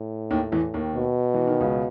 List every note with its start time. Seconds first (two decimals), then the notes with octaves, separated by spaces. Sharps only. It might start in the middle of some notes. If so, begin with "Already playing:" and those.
Already playing: A2
0.31 D#2 D#3
0.52 E2 E3
0.74 D#2 D#3
0.96 B2
1.34 E3
1.47 D#3
1.60 C#2 C#3